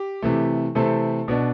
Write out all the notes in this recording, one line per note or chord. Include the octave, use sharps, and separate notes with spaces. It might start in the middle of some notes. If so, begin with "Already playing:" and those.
Already playing: G4
C3 E3 A3
C3 E3 A3 C4 A4
B2 B3 D4